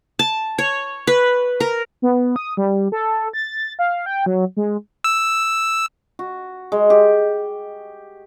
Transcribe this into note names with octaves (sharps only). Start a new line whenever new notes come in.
A5
C#5
B4
A#4
B3
D#6
G3
A4
A6
F5
G5
F#3
G#3
E6
F#4
G#3
G4